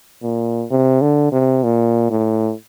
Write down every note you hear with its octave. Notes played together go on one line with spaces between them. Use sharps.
A#2
C3
D3
C3
A#2
A2